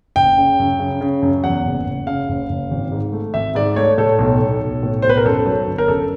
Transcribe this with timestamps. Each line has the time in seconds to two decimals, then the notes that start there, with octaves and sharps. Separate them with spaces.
0.16 F#1 G5
0.37 C#3
0.59 F#2
0.79 C#3
1.01 C#3
1.22 F#2
1.44 E2 F#5
1.65 F#1
1.86 F#1
2.07 C#3 F5
2.29 F#1
2.49 F#1
2.71 G#1
2.92 G#2
3.13 A3
3.34 G#1 E5
3.55 G#2 D5
3.76 A3 C#5
3.98 A2 A4
4.19 B1
4.40 B1
4.62 B1
4.83 A2
5.02 B1 C5
5.09 B4
5.17 A#4
5.25 F#2 A4
5.46 F#3
5.67 G1
5.78 A#4
5.88 F#2 A4